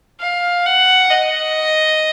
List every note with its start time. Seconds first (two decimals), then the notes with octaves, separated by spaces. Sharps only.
0.20 F5
0.65 F#5
1.10 D#5